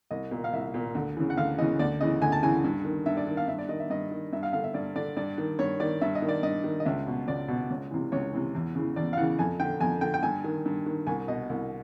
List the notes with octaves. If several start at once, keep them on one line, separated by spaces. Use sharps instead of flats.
C2 D#5
A#2
F5
C2 E5
A#2
D2
C#3 E3
F#5
D2 F5
C#3 E3 D#5
D2 D5
C#3 E3 D#5
D2 G#5
A5
C#3 E3 G#5
G2
D#3
G2 E5
D5
D#3
F5
G2 E5
D5
D#3 D#5
E5
G2 D#5
D#3
G2 E5
F5
D3 F5
E5
G2 D5
D3 D5
G2 D5
D#3
G2 C#5
D#3 D5
G2 E5
D#5
D#3
D5
G2 D#5
D#3
D#5
C#2 E5
B2
C#2 D5
B2
C#2
C3 E3
C#2 C#5
C3 E3
E2
C#3 E3
E2 D5
F5
C#3 E3 F#5
F2 G#5
D3 G5
F2 G#5
D3 G5
G5
G2 G#5
D#3
G2
D#3
C2 G#5
B2 D#5
C2